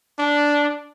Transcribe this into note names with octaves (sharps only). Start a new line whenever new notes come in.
D4